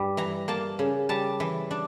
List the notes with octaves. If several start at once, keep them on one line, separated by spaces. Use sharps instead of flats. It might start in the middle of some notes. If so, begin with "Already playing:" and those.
Already playing: G2 G3
E3 A#5
A#3 A5
C#3
G3 A5
E3
D4